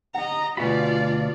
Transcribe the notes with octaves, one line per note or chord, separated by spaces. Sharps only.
D#5 F#5 A#5
D2 B2 F4 F#4 D5 G#5 B5